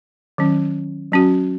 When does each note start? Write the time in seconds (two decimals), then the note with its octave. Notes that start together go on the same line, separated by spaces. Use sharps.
0.38 D#3 F#3 C#4
1.12 F#3 C#4 F#4